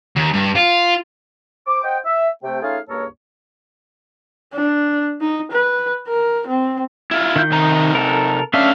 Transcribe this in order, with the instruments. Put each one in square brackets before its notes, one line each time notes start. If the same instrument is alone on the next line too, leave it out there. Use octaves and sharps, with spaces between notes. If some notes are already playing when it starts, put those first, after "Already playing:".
[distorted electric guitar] D#2
G2
F4
[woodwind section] C5 D6
C5 D#5 F#5 G5
E5
C3 A3 G5
A3 C#4 D#4 F4 G#4 F5
C#2 G2 A#3 A4 A#4 C#5
[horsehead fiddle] D4
D#4
B4
A#4
C4
[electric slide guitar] E4 F4
[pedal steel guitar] D#3 G6
[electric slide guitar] C3 D#4 A#5
[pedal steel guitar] A4 A#4
[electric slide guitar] A3 F5 [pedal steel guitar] C#4 D4 E5